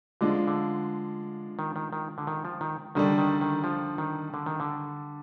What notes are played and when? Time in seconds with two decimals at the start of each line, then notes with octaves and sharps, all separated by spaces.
0.21 D3 F3 G#3 D4 F4
0.48 D3
1.59 D#3
1.76 D#3
1.93 D#3
2.18 D3
2.27 D#3
2.45 F3
2.61 D#3
2.95 D3 D#3 G3 D4
3.18 D#3
3.41 D#3
3.64 F3
3.98 D#3
4.34 D3
4.46 D#3
4.60 D3